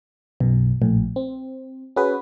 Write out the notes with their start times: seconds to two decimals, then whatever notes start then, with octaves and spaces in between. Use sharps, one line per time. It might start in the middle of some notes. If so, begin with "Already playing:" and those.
0.40 B1 F#2 B2
0.82 A#1 A2
1.16 C4
1.96 C#4 F#4 G#4 B4